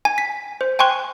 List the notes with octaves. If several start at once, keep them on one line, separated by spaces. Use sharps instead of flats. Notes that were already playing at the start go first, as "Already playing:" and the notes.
G#5
B6
C5
G5 G#5 C6 C#6 F#6